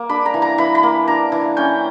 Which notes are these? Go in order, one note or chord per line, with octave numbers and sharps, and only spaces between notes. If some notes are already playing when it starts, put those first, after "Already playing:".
Already playing: A#3
D4 B5
A#5
E3
A#5
E3 B5
B5
A#3
D4 A#5
E3
C#4 G5